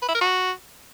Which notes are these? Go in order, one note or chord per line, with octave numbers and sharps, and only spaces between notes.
B4
E4
A#4
F#4